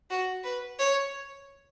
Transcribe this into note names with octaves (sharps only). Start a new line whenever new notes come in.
F#4
B4
C#5